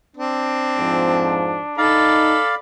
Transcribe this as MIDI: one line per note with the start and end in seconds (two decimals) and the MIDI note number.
0.17 1.38 60
0.17 2.01 62
0.77 1.64 41
0.77 1.64 44
0.77 1.64 53
1.78 2.38 63
1.78 2.58 69
1.78 2.55 74
1.78 2.55 77
1.78 2.58 83